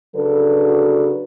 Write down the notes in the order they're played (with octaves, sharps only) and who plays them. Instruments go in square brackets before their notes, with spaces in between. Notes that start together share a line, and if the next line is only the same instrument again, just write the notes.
[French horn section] C#3 F#3 D4 F#4 A4 B4